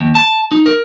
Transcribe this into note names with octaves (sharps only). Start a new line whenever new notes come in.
D#2
A5
D#4
A#4